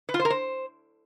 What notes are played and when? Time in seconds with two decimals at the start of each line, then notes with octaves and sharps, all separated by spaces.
0.09 B4
0.14 F4
0.20 C5
0.25 A#4
0.30 C5